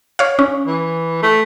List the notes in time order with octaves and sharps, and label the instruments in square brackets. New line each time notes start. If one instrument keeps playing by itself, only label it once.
[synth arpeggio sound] C#5 F5
C#4
[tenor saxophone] E3
A3